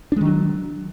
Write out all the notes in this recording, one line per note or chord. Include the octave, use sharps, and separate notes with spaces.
D#3 F#3 G#3 D4